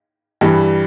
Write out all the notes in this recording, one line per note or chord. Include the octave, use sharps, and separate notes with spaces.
G2 E3 G3